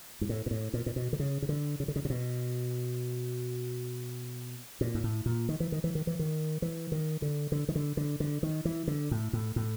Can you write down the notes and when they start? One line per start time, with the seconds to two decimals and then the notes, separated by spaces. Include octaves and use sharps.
0.21 G#2
0.29 A2
0.46 A#2
0.51 A2
0.74 A#2
0.86 A#2
0.96 B2
1.13 D3
1.20 C#3
1.42 C#3
1.49 D3
1.80 C#3
1.88 D3
1.96 C#3
2.05 C3
2.10 B2
4.81 A#2
4.95 G#2
5.04 A2
5.26 A#2
5.49 D#3
5.60 E3
5.72 D#3
5.84 E3
5.95 D#3
6.07 E3
6.19 D#3
6.62 E3
6.92 D#3
7.22 D3
7.52 D3
7.69 D#3
7.75 D3
7.97 D3
8.20 D3
8.43 D#3
8.65 E3
8.88 D3
9.11 A2
9.33 A2
9.56 A2